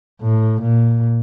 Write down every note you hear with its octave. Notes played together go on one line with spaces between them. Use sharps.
A2
A#2